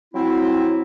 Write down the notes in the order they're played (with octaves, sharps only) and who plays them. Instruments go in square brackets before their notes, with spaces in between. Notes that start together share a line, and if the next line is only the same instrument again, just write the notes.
[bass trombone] F#3 [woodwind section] C4 E4